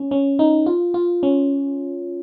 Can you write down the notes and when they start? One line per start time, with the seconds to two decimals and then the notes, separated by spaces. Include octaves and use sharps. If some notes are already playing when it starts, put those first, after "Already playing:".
Already playing: C#4
0.11 C#4
0.39 D#4
0.66 F4
0.94 F4
1.23 C#4